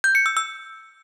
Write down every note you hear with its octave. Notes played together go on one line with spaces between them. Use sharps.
G6
C#7
E6
E6